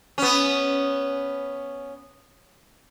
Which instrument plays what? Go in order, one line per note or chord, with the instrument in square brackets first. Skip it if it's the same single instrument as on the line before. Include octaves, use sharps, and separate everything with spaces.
[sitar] B3 C#4